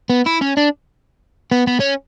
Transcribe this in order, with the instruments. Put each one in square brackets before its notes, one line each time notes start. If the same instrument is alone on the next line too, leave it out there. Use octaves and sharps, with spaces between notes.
[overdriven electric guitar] B3
E4
C#4
D4
B3
B3
C#4